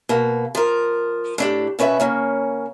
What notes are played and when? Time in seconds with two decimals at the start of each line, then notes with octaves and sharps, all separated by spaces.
0.09 B2 A#3
0.55 F3 A#4
1.38 A2 D4 G4
1.79 B2 C#4 B4 D5 E5
2.00 C#3 A#3 C#4